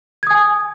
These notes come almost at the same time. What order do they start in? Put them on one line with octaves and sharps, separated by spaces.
G#6 D#6 G#5